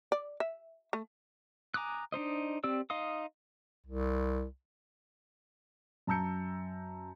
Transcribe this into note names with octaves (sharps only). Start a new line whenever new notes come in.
D5
E5
A3
G#5 A#5 D6 D#6 F#6
D4 D#4 C5 D#5
C4 G4 D5 E6
D#4 D#5 F5 C6 D#6
C2
F#2 A5 A#5 E6 G6 C#7